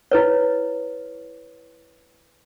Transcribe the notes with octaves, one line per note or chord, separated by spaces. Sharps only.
E4 B4 C#5